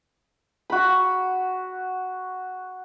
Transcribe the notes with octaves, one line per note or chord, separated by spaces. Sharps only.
F#4 B5